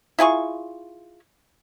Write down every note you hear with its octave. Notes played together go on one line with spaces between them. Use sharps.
E4 F4 G#4 C#6